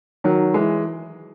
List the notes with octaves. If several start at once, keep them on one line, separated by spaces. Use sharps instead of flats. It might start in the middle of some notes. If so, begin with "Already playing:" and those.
D#3 F#3
E3 G#3